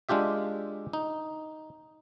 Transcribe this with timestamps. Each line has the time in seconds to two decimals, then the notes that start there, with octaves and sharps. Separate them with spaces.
0.09 G#3 D4 F4 G4 E5
0.93 D#4